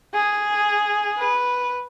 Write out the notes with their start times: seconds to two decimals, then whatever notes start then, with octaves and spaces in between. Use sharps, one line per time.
0.14 G#4
1.18 B4